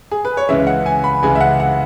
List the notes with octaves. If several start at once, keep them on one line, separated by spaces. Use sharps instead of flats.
G#4
B4
C#5
C#2 C#3 E3 G#3 E5
F#5
G#5
B5
C#2 C#3 E3 G#3 G#5
E5
F#5
F#5